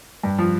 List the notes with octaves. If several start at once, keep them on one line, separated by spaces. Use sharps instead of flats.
G2
F3